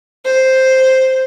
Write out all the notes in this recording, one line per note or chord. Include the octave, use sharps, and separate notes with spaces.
C5